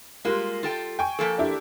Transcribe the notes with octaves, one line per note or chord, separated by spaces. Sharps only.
G3 G#3 A#3 F4
F4 A4 G5
G5 G#5 C#6
F3 A#3 A4
D4 E4 G4